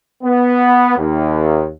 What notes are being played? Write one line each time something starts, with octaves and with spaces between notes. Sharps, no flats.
B3
D#2